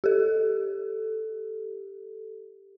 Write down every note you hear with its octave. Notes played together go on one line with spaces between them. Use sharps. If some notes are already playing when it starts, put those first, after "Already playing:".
G4 A4